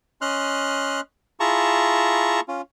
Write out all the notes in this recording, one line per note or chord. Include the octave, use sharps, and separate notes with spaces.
C#4 D#5 C6 F6 F#6
E4 F4 G#4 A5 A#5 C#6
C#4 F4